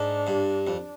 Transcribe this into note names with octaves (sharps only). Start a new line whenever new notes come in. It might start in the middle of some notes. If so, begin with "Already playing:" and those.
Already playing: G#2 D4
G2
F2